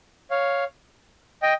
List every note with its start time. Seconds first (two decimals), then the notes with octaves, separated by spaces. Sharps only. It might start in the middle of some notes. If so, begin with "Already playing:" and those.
0.31 C#5 F5
1.42 D#5 G5